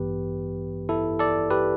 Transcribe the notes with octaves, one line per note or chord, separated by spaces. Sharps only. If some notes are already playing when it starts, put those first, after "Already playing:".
Already playing: A1 G2 E3 B3 G4 B4
E4 A4
A4 D5
G4 B4